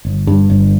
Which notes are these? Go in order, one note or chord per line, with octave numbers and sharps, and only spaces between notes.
G1
G2
G1